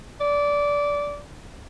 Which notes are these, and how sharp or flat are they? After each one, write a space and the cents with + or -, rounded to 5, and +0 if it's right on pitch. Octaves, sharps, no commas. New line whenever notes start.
D5 -15